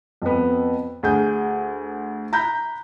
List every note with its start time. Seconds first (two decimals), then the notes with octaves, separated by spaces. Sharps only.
0.22 F2 B3
1.03 D2 G#4 G6
2.33 A#5 B5 F#6 G6